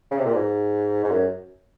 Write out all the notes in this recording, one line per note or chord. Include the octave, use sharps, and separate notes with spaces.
C#3
C3
A#2
G#2
G#2
F#2